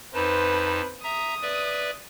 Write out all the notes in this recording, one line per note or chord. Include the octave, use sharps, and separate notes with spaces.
F2 D#4 B4 C5 A5
E5 A#5 D#6
B4 D5 E5